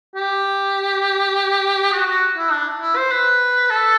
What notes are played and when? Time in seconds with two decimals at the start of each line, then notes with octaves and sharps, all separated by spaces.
0.15 G4
1.92 F#4
2.07 F#4
2.37 E4
2.51 D4
2.81 E4
2.96 C5
3.11 B4
3.70 A4